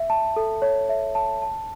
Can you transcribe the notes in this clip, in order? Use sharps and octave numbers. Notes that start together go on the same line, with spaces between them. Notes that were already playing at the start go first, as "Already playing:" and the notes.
Already playing: E5
A5
A4
C#5
E5
A5
A5